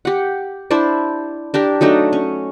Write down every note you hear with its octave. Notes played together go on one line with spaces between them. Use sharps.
G4 F#5
D4 E4 C5 D5
D4 G4 A#4
F#3 A3 D4 D#4
C#4